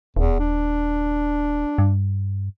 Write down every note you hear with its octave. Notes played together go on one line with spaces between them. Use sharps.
D#1 E2
D4
G2